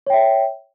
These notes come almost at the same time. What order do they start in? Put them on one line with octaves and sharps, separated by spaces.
C#5 G5 E5